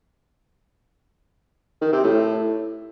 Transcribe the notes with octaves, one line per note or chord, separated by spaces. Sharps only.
D#3
C3
A2